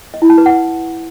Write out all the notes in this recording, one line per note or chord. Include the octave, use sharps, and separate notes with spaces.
D#5
E4
A5
B4
F#5